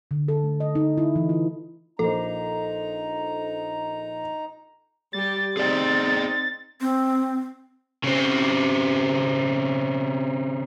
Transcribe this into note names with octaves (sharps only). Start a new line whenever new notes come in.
D3
A4
A3
D#5
D#4
E4
E3
F4
A#1 D#4 A4 A#4 C5 A#5
G3 G4 A6
C4 D#4 G#4 D5 G5
C4
C#3 C4